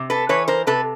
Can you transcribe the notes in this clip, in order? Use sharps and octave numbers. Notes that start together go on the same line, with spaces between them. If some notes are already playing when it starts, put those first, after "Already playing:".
Already playing: C3
A4 B4
E3 B4 C#5
A#4 C5
C3 A4 B4